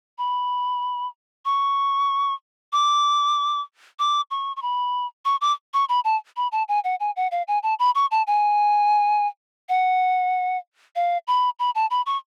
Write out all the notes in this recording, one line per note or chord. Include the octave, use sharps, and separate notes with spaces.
B5
C#6
D6
D6
C#6
C#6
B5
C#6
D6
C#6
B5
A5
B5
A5
G#5
F#5
G#5
F#5
F5
G#5
A5
B5
C#6
A5
G#5
F#5
F5
B5
B5
A5
B5
C#6